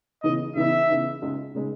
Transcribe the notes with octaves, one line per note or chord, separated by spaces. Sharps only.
C#3 E3 B3 D#4 D#5
C#3 E3 B3 D#4 E5
C#3 E3 B3 D#4
C#2 C#3 G#3 D#4 G#4
C#3 G#3 D#4 G#4